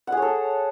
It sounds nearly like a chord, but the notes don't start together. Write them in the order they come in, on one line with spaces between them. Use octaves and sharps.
F#5 G#4 C#5 A4